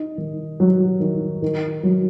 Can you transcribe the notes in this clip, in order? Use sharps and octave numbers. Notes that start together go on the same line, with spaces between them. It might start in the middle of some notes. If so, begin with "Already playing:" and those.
Already playing: D#4
D#3
F#3
D#3
D#3
F#3